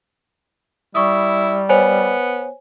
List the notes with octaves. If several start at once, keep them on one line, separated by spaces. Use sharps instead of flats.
G3 E4 C#6 D#6
B3 C5 C#5 G#5